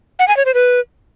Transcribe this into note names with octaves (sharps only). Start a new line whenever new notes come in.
F#5
G#5
C#5
C5
B4